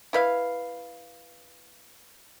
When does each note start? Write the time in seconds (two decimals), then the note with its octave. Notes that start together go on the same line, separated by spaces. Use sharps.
0.13 E4 B4 F5